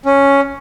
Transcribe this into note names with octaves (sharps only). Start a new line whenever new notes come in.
C#4